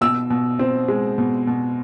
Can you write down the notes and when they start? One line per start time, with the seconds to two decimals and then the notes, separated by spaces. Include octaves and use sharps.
0.01 B2 E6
0.30 B2
0.59 C4
0.88 G#3
1.18 B2
1.47 B2